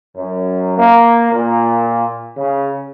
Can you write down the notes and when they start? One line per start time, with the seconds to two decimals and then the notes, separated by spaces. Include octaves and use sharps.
0.16 F#2
0.78 A#3
1.32 A#2
2.38 C#3